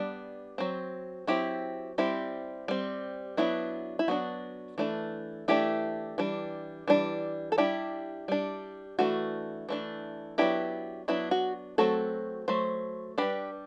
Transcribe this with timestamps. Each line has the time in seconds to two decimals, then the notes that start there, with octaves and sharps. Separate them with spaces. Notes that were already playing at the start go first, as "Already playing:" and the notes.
Already playing: G3 B3 D4
0.58 F#3 C4
1.27 F#3 C4 E4 G4
1.98 G3 C4 E4 G4
2.68 G3 C4
3.37 F#3 B3 D4 E4
3.99 E4
4.08 F#3 B3 D4 F#4
4.78 E3 A3 D4
5.48 E3 A3 D4 E4 G4
6.18 E3 G3 D4
6.88 E3 G3 D4
7.52 A4
7.58 G3 D4 E4 G4
8.28 G3 D4
8.99 E3 A3 D4 F#4
9.69 E3 A3 D4
10.38 F#3 B3 D4 E4 G4
11.08 F#3 B3 D4 E4
11.31 F#4
11.78 F#3 A3 C4 F#4 A4
12.48 F#3 A3 C5
13.18 G3 D4 G4 B4